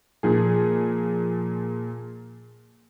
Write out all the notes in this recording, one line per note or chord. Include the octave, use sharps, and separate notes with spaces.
A#2 F3 G#4